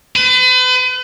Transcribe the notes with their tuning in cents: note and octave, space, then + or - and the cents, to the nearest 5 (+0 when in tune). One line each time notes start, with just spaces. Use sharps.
B4 +40